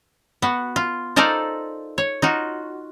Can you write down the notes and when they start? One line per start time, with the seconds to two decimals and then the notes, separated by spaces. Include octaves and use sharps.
0.42 B3 F#4
0.76 F4
1.16 D#4 A4 A#4 C5 D5 F5
1.98 C#5
2.22 D#4 F4 F#4